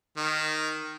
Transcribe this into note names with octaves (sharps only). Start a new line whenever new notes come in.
D#3